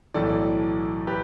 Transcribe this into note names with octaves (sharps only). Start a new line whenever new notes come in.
B1 A2 E3 A4 D5
G4 B4